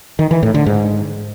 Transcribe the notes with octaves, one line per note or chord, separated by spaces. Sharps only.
D#3
E3
A2
D3
G#2